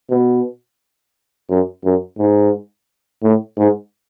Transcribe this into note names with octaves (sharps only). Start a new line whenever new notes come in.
B2
F#2
F#2
G#2
A2
G#2